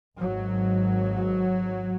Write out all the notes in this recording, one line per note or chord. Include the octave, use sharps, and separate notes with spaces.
G#1 G#2 F#3